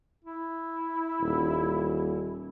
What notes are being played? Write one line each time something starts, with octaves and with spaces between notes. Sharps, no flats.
E4
D#1